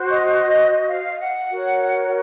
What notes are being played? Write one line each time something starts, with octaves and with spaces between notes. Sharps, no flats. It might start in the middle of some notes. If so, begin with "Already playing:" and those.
Already playing: F#4 C5
D#5
F5
F#5
F#4 A#4 C#5